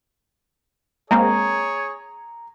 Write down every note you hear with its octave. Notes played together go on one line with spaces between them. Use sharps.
G#3 A#3 C4 G#4 C#5 A#5